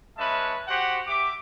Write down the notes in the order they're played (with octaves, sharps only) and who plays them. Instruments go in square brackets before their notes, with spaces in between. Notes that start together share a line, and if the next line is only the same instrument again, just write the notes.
[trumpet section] G#3 C#4 B4 E5 A5
F#4 G4 C5 F#5
G4 E5 D6